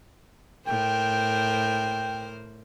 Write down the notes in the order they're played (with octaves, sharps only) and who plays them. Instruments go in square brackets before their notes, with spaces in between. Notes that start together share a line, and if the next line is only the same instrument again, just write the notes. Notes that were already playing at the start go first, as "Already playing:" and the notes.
[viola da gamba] A2 A#4 C5 [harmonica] G5